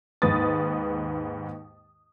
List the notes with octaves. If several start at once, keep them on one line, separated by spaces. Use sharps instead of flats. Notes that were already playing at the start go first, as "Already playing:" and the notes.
D#2 G#2 B4 D#6 A6